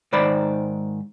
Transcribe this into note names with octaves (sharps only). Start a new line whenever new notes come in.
G#2 D#3 C5 D5 B5